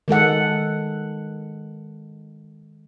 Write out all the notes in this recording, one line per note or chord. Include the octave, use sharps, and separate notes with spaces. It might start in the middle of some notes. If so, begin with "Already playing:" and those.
D#3 G#3 A4 F#5